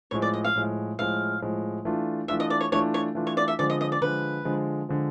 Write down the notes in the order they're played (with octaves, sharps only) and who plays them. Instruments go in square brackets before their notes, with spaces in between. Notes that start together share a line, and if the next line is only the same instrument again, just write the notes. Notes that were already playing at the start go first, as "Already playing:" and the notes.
[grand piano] A2 F3 G#3 [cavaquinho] C#5
[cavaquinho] D5
D#5
F5
[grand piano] A2 F3 G#3
[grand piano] A2 F3 G#3 [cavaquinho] F5
[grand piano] A2 F3 G#3
E3 A3 D4 F4
[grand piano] E3 A3 D4 F4 [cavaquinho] E5
[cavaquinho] D#5
D5
C#5
[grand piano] E3 A3 D4 F4 [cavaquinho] C#5
[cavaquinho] C#5
[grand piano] E3 A3 D4 F4
[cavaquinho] C#5
D5
E5
[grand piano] D3 F3 G#3 [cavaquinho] D5
[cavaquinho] D#5
D#5
D5
[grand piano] D3 F3 G#3 [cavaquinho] B4
[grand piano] D3 F3 G#3
D3 F3 G#3